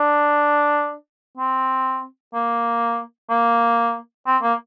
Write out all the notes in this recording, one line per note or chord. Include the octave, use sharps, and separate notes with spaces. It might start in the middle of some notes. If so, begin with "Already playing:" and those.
Already playing: D4
C4
A#3
A#3
C4
A#3